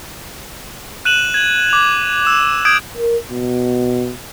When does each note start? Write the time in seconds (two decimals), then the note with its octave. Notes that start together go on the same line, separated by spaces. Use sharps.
1.05 F#6 D#7 E7 F#7
1.34 G#6 F#7
1.70 D6 F7
2.25 E6 E7
2.65 D#6 G6 G#6 D7
2.98 A#4
3.29 B2